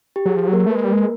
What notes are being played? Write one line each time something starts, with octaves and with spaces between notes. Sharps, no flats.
G4
F#3 G#4
F3
F#3
A#3 A#4
A3
B4
G#3
A#3 A#4
G3
G#3